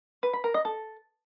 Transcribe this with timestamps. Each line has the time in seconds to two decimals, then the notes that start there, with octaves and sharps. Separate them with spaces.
0.23 B4
0.33 B5
0.44 A#4
0.54 D#5
0.65 A4